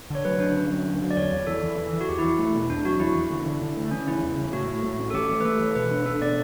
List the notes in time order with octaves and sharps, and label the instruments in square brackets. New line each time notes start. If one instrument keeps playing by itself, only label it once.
[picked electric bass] D3 [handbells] C#5
[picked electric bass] F#3 [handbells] B4
[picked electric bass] D3 [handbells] D4
[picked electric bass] C#4
F#3
D3
F#3
[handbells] D5
[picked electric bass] E2 [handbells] C#5
[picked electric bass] E2
[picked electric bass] E3 [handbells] A4
[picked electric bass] E3
E3
E3
[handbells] F#4
[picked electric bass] E2 [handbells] G4
[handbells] E4
[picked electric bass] E2
[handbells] E4
[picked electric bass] A3
B2
[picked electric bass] E2 [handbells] D4
[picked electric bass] F#3 [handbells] F#4
[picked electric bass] E2 [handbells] E4
[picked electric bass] E2
D3
D3
D3
A3
[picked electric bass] E3 [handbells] C#4
[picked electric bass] C#3 [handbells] E4
[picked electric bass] E2
C#3
[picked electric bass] A2 [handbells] F#4
[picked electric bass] A2
A2
C#4
[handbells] A4
[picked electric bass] E3 [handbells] G4
[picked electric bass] A3
[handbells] B4
[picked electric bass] A3 [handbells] A4
[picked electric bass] E3
[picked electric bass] B2 [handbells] B4
[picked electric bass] D4
[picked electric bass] D4 [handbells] A4
[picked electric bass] B2 [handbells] D5